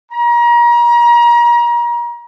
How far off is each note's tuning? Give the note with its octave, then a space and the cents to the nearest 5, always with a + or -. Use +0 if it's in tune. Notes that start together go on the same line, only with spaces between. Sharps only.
A#5 +35